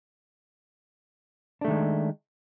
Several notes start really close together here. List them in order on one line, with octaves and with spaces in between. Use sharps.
D4 A3 D#3 G#3